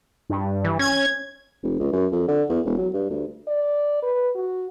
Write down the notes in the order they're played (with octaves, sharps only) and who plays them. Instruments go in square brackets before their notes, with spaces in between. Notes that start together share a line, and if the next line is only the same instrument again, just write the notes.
[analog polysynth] G2
[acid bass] E3
[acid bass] C#4 [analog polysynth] G#6
[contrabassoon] F1
C#2
F#2
F2
D3
E2
E1
F#3
G2
D2
[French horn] D5
B4
F#4